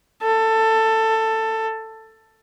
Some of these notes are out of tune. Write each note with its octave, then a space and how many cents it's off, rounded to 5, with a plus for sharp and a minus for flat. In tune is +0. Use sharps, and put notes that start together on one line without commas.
A4 +15